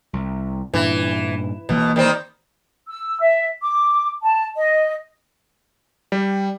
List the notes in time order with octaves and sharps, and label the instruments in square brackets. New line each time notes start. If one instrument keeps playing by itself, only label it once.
[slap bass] C2
[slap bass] G2 A#2 D4 [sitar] E3
[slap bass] E1 E3 A#3 [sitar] B2
[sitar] D#3 G3 C4
[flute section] E6
E5
D6
A5
D#5
[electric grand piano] G3